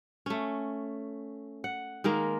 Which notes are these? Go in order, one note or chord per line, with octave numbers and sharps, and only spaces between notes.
A3 C#4
F#5
D#3 G#3 A#3 A#4